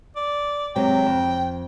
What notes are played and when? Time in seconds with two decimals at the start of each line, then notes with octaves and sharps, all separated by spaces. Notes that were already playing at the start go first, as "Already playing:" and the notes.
0.16 D5
0.76 C3 F#3 G#3 G5
1.06 F2